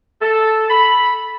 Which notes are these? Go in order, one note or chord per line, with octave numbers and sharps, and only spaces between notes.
A4
B5